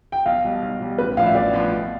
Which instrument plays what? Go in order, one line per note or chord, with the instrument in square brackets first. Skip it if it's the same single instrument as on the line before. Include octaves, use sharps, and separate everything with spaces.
[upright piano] G5
[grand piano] B1 [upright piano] F5
[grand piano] B2 G3
B1
B2 G3
[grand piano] A1 [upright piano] B4
[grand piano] A2 F3 B3 D4 [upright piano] F5
[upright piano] E5
[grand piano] A1 [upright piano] D5
[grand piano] A2 F3 B3 D4
B2